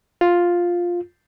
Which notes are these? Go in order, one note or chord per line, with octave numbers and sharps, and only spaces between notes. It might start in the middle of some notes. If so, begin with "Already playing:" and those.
F4